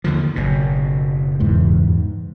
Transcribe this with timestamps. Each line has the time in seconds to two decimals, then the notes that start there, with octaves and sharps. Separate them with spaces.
0.04 D#2 D3 F3
0.36 F#1 B2
1.40 E2 G#2 E3